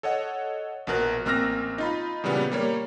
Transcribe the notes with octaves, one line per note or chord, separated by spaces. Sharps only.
A4 C#5 D#5 F#5
A#1 B2 A#4 F#6
A1 A#3 C4 E6 F6 A#6
D#4 F4 B5
A#2 C#3 E3 G3 B3
G3 A#3 C#5